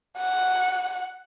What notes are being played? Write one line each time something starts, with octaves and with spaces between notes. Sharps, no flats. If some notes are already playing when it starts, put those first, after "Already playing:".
F#5